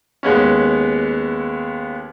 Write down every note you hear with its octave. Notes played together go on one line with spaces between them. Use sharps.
D#2 G#3 B3 C#4